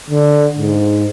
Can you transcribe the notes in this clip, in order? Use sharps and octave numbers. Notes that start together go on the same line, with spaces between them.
D3
G#2